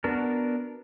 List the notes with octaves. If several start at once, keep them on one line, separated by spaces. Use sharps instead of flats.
B3 D4 F#4 A#4